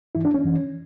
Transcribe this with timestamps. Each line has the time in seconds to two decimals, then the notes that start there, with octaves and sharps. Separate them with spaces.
0.15 G2 E3 E4
0.25 D4
0.34 C#4
0.44 F#2 E3